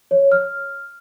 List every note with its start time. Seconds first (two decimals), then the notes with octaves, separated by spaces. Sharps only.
0.11 C#5
0.32 F6